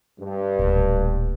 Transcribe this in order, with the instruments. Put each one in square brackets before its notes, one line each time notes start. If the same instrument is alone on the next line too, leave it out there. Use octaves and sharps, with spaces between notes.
[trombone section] G2
[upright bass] D1 A#2